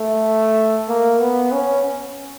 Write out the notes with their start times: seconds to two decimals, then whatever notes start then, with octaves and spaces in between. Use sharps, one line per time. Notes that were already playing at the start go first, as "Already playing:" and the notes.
Already playing: A3
0.89 A#3
1.21 B3
1.52 C#4